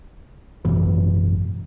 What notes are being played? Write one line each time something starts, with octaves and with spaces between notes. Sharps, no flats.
G#1 F#2 B2 E3